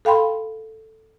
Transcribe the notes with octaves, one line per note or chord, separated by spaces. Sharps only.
A4 F5 G5 B5 C6